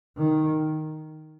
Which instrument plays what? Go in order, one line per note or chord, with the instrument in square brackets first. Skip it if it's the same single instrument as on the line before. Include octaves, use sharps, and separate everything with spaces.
[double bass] D#3